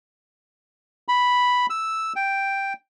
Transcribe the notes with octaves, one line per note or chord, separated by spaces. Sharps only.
B5
E6
G5